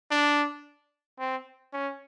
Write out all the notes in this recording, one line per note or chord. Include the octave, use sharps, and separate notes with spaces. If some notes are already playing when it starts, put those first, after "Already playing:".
D4
C4
C#4